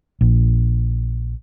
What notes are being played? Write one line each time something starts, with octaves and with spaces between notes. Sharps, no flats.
A#1